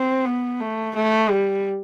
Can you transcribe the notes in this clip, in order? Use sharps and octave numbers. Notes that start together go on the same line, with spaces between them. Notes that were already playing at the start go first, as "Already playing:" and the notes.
Already playing: C4
B3
A3
A3
G3